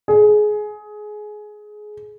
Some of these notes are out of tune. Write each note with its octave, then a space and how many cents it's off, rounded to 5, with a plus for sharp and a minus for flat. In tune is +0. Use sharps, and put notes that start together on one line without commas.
G#4 +20